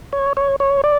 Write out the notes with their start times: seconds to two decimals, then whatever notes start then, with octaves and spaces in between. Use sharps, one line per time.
0.13 C#5
0.37 C#5
0.60 C#5
0.84 D5